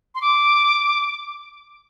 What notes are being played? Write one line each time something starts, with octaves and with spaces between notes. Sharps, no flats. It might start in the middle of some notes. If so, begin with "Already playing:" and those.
C6
D6